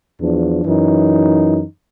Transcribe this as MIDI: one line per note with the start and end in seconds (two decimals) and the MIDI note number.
0.20 0.64 40
0.20 0.64 53
0.20 0.64 62
0.65 1.64 42
0.65 1.64 52
0.65 1.64 63